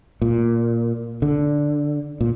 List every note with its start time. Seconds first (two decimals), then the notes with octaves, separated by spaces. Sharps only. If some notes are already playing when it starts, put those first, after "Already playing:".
0.22 A#2
1.22 D3
2.21 A#2